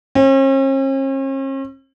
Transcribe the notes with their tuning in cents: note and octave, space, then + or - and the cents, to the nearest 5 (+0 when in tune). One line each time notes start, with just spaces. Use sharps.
C#4 -45